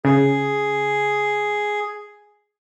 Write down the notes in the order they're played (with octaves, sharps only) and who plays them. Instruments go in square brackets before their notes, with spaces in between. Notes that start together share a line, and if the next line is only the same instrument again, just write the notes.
[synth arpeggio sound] C#3 [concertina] G#4